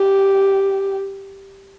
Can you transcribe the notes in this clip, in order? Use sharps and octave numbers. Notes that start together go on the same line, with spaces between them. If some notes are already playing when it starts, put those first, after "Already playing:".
Already playing: G4